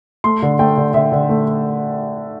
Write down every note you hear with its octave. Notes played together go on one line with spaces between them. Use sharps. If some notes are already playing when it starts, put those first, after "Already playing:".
A3 C6
D3
A3 G5
D3
D3 E5
D3
A3